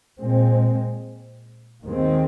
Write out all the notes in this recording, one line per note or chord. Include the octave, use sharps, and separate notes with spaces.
A#2 G#3 C4
D#2 D#3 G#3 C4